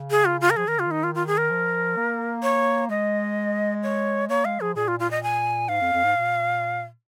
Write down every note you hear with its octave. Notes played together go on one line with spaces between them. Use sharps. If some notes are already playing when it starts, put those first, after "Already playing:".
Already playing: C#3
G#4
F4
F4
A#4
F3 G#4
D#3 A#4
C#3 F4
D#3 D#4
F4
F4
G#4
A#4
F3
A#3
C#5
G#3 D#5
C#5
A#3 C#5
G#3 F5
F3 G#4
A#2 G#4
F4
F4
D#5
G#5
G#2 F5
F2
F2
G#2
A#2